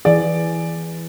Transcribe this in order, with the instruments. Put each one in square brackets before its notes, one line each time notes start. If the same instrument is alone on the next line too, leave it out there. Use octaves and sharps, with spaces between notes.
[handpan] E3 G#4 [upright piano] D5